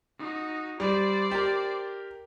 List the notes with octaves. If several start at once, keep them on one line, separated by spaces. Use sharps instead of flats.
D#4 F#4
G3 C5 D5
G4 A#4